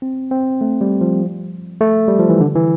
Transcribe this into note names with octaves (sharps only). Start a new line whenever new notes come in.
C4
C4
A3
G3
F3
A3
G3
F3
E3
D3
E3